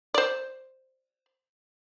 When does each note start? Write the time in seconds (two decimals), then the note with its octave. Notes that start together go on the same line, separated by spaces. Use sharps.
0.14 C5 D5